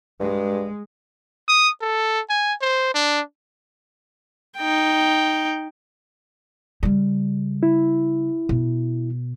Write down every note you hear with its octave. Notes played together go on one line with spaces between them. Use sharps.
G2 G#3
D#6
A4
G#5
C5
D4
D#4 G5
C#3 G3
E4
B2